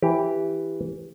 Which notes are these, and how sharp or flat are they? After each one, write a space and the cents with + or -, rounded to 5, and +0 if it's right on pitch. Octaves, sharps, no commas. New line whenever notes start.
E3 +0 G4 +0